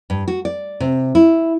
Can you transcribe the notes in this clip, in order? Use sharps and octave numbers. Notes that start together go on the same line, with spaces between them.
G2
F#4
D5
C3
E4